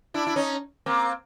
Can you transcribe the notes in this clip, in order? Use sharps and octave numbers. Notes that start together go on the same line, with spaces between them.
D4 E4
E4
C#4 D#4
A#3 C4